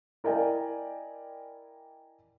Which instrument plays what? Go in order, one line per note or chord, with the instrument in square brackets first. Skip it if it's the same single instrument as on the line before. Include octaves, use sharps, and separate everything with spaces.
[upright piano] E4 A#4 D5 D#5 G5 G#5